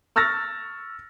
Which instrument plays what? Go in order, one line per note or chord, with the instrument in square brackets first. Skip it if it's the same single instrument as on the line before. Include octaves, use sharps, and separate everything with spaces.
[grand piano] C#6 E6 F6 A6 A#6